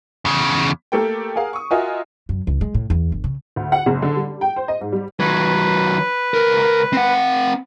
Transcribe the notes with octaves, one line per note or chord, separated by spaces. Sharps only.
E2 C#3
A3 A#3 G4 A4 A#4 G5
G#4 A#4 F5 F#5
C#6 D#6
F4 F#4 A#4 D#5 E5 G#5
F#2
C#2
G#3
A2
E2
G1
C#3
D2
F#5
F#1
D3
G3
G5
C5
D#5
G#2
G3
D#3 F#3 B4
C#2 A#4
C4 F#5